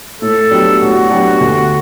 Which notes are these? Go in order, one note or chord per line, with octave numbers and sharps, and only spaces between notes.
A2 A4
F#3 B3 D4 G4
A2 F#4
F#3 B3 D4 G4
D2